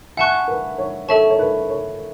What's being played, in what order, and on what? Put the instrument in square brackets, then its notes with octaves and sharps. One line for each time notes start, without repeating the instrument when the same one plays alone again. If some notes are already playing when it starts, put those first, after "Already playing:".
[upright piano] E5 G#5 [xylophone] F#5 A5 C#6 F#6
[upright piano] B4
C#5
[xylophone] A4 E5 A5 C#6 [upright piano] C#5
[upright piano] C#5
B4
C#5